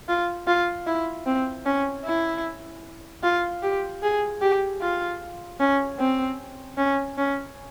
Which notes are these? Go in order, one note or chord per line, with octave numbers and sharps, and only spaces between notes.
F4
F4
E4
C4
C#4
E4
F4
G4
G#4
G4
F4
C#4
C4
C#4
C#4